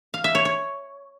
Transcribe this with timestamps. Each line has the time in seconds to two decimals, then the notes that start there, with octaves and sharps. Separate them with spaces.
0.14 F5
0.24 E5
0.35 C#5
0.45 C#5